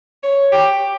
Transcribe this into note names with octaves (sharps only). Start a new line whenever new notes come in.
C#5
G4